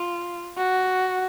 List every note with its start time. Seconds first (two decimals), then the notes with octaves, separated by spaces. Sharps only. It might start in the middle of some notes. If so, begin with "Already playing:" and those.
Already playing: F4
0.57 F#4